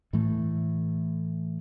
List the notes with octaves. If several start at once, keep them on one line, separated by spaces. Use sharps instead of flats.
A2 E3 A3